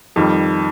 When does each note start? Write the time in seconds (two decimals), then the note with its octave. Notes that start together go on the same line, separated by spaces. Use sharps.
0.16 F2 D#3 G3